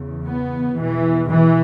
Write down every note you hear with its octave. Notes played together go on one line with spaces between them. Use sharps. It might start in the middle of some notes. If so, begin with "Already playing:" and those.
Already playing: E2 C#3
B3
E2 B2 E3
E3